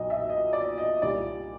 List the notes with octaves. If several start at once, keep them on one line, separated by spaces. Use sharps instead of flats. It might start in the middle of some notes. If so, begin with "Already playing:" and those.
Already playing: B1 A#2 F#3 D#5
E5
D#5
D5
D#5
C2 A#2 G3 D5